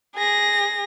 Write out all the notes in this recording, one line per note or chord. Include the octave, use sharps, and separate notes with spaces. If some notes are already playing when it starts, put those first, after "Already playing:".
G#4 A#6